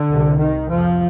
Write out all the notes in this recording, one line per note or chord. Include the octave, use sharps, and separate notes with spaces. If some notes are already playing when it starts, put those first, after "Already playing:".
Already playing: D3
C2 C3
D#3
F2 C3 F3